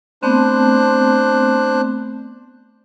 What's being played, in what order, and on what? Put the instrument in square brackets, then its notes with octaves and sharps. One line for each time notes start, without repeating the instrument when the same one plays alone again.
[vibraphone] A3 B3 C4 [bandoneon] D4 C5 F#6